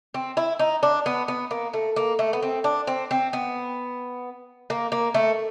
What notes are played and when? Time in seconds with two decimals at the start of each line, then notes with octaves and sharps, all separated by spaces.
0.14 C4
0.37 E4
0.59 D#4
0.83 D4
1.06 B3
1.28 B3
1.51 A#3
1.74 A3
1.96 A#3
2.19 A3
2.33 B3
2.42 C4
2.64 D4
2.87 C4
3.11 C4
3.33 B3
4.70 A#3
4.92 A#3
5.14 A3